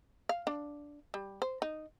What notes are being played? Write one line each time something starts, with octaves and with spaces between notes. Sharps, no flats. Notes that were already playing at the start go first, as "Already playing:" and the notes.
F5
D4
G3
C5
D#4